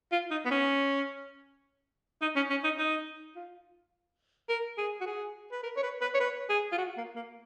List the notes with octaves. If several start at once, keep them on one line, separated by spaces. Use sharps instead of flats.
F4
D#4
B3
C#4
D#4
C#4
C#4
D#4
D#4
F4
A#4
G#4
F#4
G#4
B4
A#4
C#5
B4
B4
C#5
B4
G#4
F4
F#4
A#3
A#3